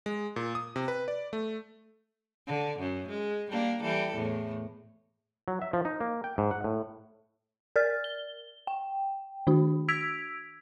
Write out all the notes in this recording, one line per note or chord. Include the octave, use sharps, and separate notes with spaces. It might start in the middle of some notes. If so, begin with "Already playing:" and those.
G#3
A#2
D#6
C3
B4
D5
A3
D3
F#2
G#3
G3 A#3 D4
E3 G3 A4
E2 A2
F#3
E5
F3
D#4
A#3
G5
G#2
F#5
A2
A#4 D5 F6 A6
G7
G5
D#3 D4 F#4
E6 G#6 B6 D7 F7